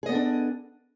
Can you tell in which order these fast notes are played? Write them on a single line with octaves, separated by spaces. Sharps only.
G#4 D#5 B3 A4 D4